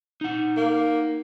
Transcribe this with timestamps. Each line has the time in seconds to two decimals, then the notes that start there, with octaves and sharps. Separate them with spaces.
0.21 D#4 F#5
0.57 A#3